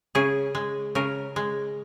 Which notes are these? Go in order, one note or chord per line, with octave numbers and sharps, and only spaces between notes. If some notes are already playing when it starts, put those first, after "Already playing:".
C#3 G#4
G#3
C#3 A#4
G#3